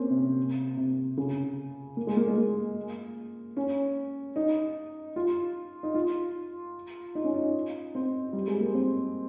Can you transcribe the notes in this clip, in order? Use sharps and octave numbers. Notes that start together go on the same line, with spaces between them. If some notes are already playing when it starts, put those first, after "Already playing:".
Already playing: A#3 C4 C#4
C3
C3
C3
C#3
A#3
G#3
A#3
G#3
A#3
C#4
D#4
F4
D#4
F4
D#4
C#4
D#4
C4
G3
G#3
A#3
C4